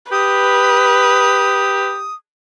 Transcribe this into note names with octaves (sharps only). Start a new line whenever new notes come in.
G4 B4 D#6